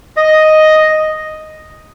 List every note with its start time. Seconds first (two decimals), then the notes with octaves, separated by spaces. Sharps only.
0.17 D#5